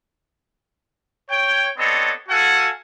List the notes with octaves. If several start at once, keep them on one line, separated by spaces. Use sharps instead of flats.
C#5 G5
B3 C4 D4 A4 C#5 D#5
F#4 A4 F5 F#5 G#5